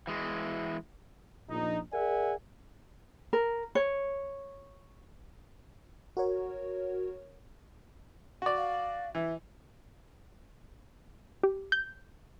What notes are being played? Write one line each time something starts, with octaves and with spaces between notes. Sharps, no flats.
E3 G#3
A#1 D#4
G#4 A#4 D5 E5 F#5 G#5
A#4
C#5
F#4 A#4 C#5
F#4 D5
F5
E3 E5
G4
G6